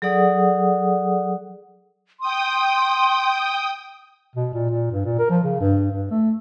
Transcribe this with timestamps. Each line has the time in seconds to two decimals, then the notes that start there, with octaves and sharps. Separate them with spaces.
0.02 F#3 G#4 A4 D5 F#5 D#6
2.20 G5 C6 D#6
4.35 B2
4.54 A#2
4.69 A#2
4.92 G2
5.05 A#2
5.19 A#4
5.30 F3
5.44 C#3
5.61 G2
5.91 G2
6.11 A3